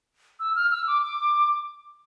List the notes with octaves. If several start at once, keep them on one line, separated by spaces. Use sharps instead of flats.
E6
F6
E6
D6
D6